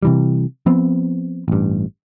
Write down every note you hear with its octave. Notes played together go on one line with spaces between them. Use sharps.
C3 E3 G3
F3 B3 C4
A1 G2